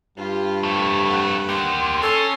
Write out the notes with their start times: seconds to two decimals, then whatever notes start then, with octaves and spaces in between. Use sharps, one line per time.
0.18 G2 F4 G4
0.63 F2 A3
1.08 F#5
1.49 A#3 G4 C6
2.02 C#4 A4 C6